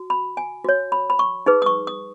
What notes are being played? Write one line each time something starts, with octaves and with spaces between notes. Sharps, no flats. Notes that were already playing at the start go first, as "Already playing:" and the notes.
Already playing: F#4
B5
G#5
F#4 C#5
B5
B5
C#6
D#4 G#4 B4
D#6
C#6
D#6